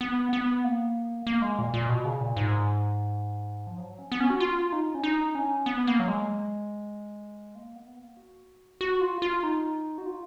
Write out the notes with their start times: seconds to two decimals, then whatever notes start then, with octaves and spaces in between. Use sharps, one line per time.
0.01 B3
0.33 B3
0.64 A#3
1.27 A#3
1.42 G#3
1.59 A#2
1.74 A#2
1.89 B2
2.05 C#3
2.21 A#2
2.37 G#2
3.67 F3
3.78 F#3
3.99 C#4
4.12 B3
4.20 C#4
4.30 F#4
4.40 F4
4.72 D#4
4.95 C#4
5.04 D#4
5.35 C#4
5.66 B3
5.87 A#3
6.00 F#3
6.08 G#3
7.55 A#3
7.76 B3
7.97 A#3
8.17 F#4
8.81 F#4
9.01 F4
9.22 F4
9.43 D#4
9.98 F#4
10.06 F4